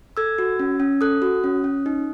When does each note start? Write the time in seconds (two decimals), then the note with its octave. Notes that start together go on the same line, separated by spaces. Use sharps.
0.17 A4 E6 G#6
0.38 F#4
0.59 C#4
0.80 C#4
1.01 A4 D#6 F#6
1.22 F#4
1.44 C#4
1.64 C#4
1.86 D#4